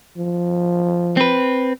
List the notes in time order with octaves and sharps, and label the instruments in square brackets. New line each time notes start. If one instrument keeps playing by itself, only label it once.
[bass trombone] F3
[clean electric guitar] C4 B4